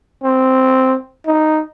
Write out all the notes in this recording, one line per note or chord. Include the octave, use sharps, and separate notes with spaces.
C4
D#4